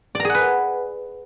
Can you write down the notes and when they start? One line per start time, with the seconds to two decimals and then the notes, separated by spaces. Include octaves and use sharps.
0.15 D5
0.20 A#5
0.25 G#4
0.30 F#5
0.35 B4